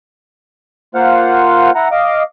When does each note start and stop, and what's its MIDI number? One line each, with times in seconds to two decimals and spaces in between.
0.95 1.71 58
0.95 1.71 65
0.95 1.71 72
0.95 1.71 77
0.95 1.71 78
1.75 1.88 64
1.75 1.88 78
1.75 1.88 82
1.92 2.23 75
1.92 2.23 77
1.92 2.23 86